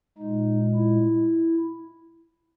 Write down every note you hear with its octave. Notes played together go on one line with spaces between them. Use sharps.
A#2 G#3 D#4
E4